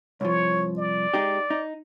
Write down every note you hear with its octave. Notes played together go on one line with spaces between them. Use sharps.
C2 G2 F3 C#5
D5
G#3 D#4 G4
D#4